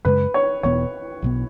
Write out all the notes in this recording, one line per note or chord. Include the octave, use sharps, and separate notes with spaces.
F#2 C#3 G#3 B4
C#5
E1 E2 B2 B3 C#5
B1 B2 B3